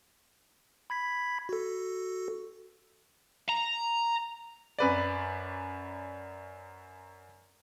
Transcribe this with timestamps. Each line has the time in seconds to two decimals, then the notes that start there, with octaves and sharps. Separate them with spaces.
0.90 B5 G#6 B6
1.49 F#4 A4
3.49 A#5
4.79 F#2 B4 D5